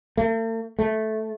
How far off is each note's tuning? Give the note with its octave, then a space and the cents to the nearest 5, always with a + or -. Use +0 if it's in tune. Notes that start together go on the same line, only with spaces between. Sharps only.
A3 +45
A3 -10